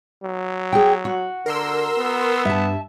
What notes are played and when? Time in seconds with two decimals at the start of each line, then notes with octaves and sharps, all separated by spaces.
0.23 F#3
0.73 G#4 G5
1.05 F#4
1.46 D3 A#4 C6 E6
1.98 B3
2.45 G2 E5 A5